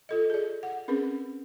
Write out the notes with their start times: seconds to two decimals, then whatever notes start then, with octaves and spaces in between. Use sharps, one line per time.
0.09 F4 A4 D#5
0.30 G#4 D5
0.63 F#5
0.88 C4 C#4 G#4 A#4 B4